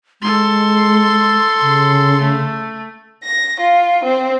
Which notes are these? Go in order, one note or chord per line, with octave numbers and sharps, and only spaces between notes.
G#3 A4 C6
C#3
A3
A#6
F4
C4